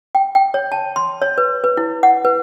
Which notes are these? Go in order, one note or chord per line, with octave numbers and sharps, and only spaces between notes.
G5
G5
C#5
A5
C6
C#5
B4
B4
E4
F#5
B4